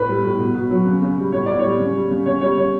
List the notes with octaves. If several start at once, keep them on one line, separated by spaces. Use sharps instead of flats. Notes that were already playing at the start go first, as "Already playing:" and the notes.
Already playing: A2 B4
G3
A2
B2
B2
F#3
C#3
C#3
G3
A2 C#5
A2 D5
G3 C#5
C#3
G3
C#3
C#3 C#5
G3 C#5
C#3 C#5